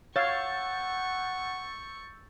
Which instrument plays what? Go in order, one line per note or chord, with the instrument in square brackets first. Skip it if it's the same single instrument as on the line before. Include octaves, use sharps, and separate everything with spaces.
[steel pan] C#5 F5 [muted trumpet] F#5 [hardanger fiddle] C#6 [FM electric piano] E6 G6 A6